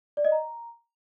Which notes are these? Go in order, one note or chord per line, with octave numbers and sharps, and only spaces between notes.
D5
D#5
A#5